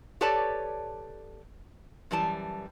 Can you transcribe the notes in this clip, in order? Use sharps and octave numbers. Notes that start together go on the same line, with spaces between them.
G4 A4 B4 C#5 D5 A5
F#2 E3 G3 A5